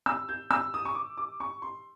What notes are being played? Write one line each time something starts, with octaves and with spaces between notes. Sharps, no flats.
E6
G6
E6
D#6
C#6
D6
D6
C#6
C6